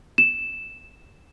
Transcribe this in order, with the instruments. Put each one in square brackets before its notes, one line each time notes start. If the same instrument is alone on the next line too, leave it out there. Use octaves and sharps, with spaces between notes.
[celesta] E7